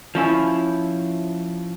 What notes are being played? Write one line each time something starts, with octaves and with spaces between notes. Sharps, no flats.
F3 C#4 E4